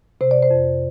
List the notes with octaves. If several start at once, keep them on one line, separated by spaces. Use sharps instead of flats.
C3 C5
D5
C5
F2